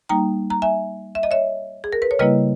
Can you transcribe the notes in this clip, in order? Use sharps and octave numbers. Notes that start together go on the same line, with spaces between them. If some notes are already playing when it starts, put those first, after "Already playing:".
G3 A#3 D#4 G5 A#5
A#5
E5 G#5
E5
D#5
C#5 E5
G#4
A#4
B4
C#5
C#3 G3 A#3 E4 B4 D#5